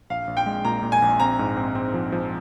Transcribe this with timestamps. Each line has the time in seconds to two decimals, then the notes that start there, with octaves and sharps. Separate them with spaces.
0.10 A#1 F5
0.27 A#1
0.37 G5
0.46 G#3
0.65 A#2 A#5
0.83 A#2
0.92 G#5
1.02 A#1
1.20 C4 A#5
1.39 G#2
1.57 C4
1.75 C4
1.94 F3
2.12 F3